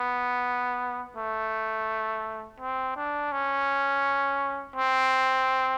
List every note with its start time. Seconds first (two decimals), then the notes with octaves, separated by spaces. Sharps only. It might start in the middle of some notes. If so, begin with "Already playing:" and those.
Already playing: B3
1.16 A3
2.60 C4
2.96 D4
3.32 C#4
4.76 C4